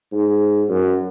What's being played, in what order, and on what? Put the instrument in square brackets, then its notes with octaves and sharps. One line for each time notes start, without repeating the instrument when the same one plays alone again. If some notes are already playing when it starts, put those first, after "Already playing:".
[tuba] G#2
F#2